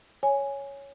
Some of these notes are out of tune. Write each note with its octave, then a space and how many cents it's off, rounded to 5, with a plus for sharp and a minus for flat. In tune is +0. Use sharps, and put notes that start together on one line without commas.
C#5 +5 G#5 +0